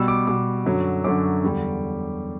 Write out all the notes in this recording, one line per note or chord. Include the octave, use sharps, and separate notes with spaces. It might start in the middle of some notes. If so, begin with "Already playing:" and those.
Already playing: B2 G3 E6
D6
B2 G3 D6
F#2 D3 F#3
F#2 D3 F#3 D6
E2 D3 G3